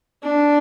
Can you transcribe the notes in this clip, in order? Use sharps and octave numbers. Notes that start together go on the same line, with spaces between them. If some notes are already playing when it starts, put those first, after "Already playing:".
D4